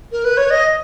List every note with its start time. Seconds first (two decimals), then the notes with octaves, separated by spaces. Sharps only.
0.12 A#4
0.25 B4
0.37 C#5
0.50 D#5